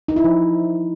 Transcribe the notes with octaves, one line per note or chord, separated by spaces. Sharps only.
D#4
E4
F3